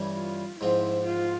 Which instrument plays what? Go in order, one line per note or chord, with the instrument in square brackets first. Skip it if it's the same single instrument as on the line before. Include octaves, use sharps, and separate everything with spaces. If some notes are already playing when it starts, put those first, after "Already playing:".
Already playing: [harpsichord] G2 E3 G3 C#4
[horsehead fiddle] F4
[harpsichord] G#2 F3 C4 [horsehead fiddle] E4
[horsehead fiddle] F4